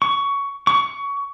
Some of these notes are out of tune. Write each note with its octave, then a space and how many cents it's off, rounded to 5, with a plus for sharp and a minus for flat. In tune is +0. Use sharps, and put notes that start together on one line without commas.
C#6 +15
C#6 +20